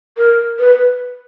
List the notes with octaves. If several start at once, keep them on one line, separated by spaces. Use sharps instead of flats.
A#4
B4